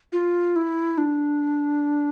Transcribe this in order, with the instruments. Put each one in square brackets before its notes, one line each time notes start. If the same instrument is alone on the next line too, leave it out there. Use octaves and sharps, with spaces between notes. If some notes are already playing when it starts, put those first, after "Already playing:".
[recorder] F4
E4
D4